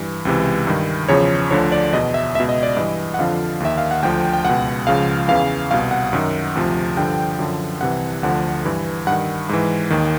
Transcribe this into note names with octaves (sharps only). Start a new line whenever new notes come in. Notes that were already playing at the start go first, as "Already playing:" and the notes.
Already playing: G2 E3
C#2 C3 E3
G2 D#3
E2 C#3 F3 C#5
D2 D3 F3 C#5
D5
E2 B2 D#5
E5
C#2 B2 E5
D#5
D5
G2 E3 D#5
F#5
F2 D3 F3 F5
D#2 D#3 E5
F5
F#5
D2 D3 F3 G5
G5
C#2 B2 F#5
C#2 C#3 F3 F5
E2 C#3 E3 F5
C2 B2 F5
F#5
F#2 D#3
D2 C3 F3
G2 D3 F3 G5
F#2 D3 F3
C2 C3 E3 F#5
D2 D3 F3 F#5
G2 E3
G2 D#3 F#5
G#2 E3
D#2 D#3